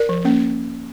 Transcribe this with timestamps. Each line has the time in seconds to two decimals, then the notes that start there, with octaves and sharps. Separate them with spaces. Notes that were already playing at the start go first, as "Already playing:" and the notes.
Already playing: A#4 D5
0.09 F3
0.25 A#3 C#4